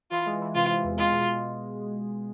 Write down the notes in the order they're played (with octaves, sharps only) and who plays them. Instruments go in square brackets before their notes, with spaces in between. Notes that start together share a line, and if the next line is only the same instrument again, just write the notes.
[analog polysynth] E3 [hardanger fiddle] F4
[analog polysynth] G#3
E3
[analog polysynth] C3 [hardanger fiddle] F4
[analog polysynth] E3
E2
[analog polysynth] G#3 [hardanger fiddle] F4
[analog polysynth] B2